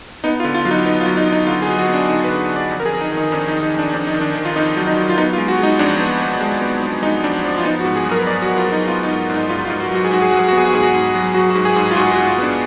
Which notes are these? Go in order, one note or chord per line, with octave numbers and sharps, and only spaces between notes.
B3 D#4
F4
D3
F4
F#3 F4
D#4
B3 D#4
F4
F#3
D#4
D3
D#4
D3 F4
G#4
F#3
F#4
B3
D4
D3 D#4
B4
D3
D3
D5
F2
A#4
G#4
F2
D#4
D#3
D#4
F2 D4
D#4
D#3
D#4
F2 D4
F2 D4
D#4
D#3
D4
D#3
F4
F2 D#4
F#3
D#4
F#3
F4
B3 D#4
F4
G#3
F#4
G#3 D#4
F2 D4
B3
B3
G#3
B3
B3
G#3 D#4
F2 D4
F3 D4
F4
B3 D#4
F#4
G#2
G#4
F#3
A#4
B4
B3 D5
F#4
F#3
F4
F#3 D#4
B3 F4
D#4
G#2
G#2 D#4
G#2 F4
F4
G#2
F#4
F#3 F#4
G#4
G#2 F#4
G#4
F#3 F#4
G#4
F#4
B3
G#4
F#4
G#2 G#4
F#4
G#2
F#3
F#3 F#4
F#4
G#2
G#4
G#2
F4
G#2 F#4
F#4
G#2
F#4
F4
B3 D4